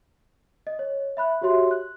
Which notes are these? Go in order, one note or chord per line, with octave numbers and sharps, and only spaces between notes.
D#5
C#5
E5 B5 F#6
F#4 G4 C#5 E5 C6
F#6